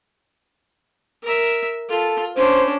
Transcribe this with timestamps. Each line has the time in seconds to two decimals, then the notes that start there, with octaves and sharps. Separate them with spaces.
1.23 A#4 E5
1.89 F4 A4
2.36 C#4 D4 C5